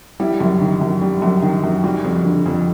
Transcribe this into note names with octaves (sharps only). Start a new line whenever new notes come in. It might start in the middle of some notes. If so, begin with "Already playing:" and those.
G3 E4
F#2
D#3
F#2
G3
F#2
D#3
F#2
G3 F#4
F2
D3
F2